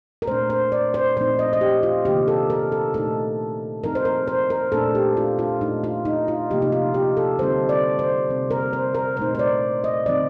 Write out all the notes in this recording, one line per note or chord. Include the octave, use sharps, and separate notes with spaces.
A#4
A#2 A3 D4 C5
C5
D5
C5
A#2 F3 A3 C4 D#4 C5
D#5
D#5
G4
F4
C3 D#3 A#3 D4 G4
A4
A#4
A4
A#2 A3 D#4 A4
F3 C4 D#4 A#4
C5
A#4
C5
A#4
A#2 A3 D4 A4
G4
F4
F4
A#2 A3 D4 D#4
F4
D#4
F4
C3 F3 A#3 G4
D#4
F4
G4
A4
D3 G3 C4 D#4 C5
D5
C5
C3 G3 C4
A#4
C5
A#4
A#2 A3 D#4 C5
C5
D5
D#5
D3 F3 C4 D#4 D5